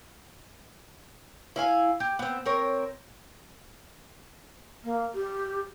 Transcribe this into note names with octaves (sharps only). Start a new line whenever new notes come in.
E4 F5 G#5
G4
B3 C4
C4 A#4 C#5
A#3
G4